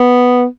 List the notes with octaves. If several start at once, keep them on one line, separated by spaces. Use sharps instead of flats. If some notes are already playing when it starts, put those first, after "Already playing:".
Already playing: B3